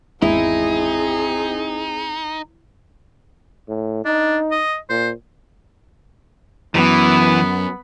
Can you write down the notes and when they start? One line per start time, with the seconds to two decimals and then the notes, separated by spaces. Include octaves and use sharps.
0.22 G#1 E2 G#3 C4 D#4 E4 G#4
3.68 A2
4.05 D4 D#4
4.51 D#5
4.90 A#2 C5
6.75 F#2 E3 B3